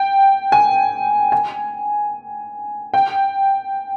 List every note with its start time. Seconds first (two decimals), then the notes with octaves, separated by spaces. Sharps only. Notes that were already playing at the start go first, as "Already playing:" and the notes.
Already playing: G5
0.52 G#5
1.32 G#5
2.94 G5